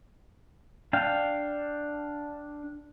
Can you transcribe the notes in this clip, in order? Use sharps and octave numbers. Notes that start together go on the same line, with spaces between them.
D4 F5 G5